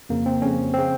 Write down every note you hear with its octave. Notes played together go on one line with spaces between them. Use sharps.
F2 C#3 A#3
C4
F2 C#3 C#4
C#3 C4